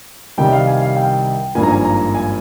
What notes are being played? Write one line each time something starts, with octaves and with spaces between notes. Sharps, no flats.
C2 C3 D#3 G3 G5
F5
G#5
F5
G5
G#1 G2 F3 A#3 G#5
A#5
G#5
A#5
G#5